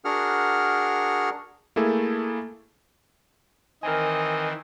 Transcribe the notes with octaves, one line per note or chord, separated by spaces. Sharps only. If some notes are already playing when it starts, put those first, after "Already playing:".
D4 F#4 G#4 A#4 F#5 F6
A3 A#3 E4 G#4 A4
D#3 E3 C4 A#4 D#5 G#5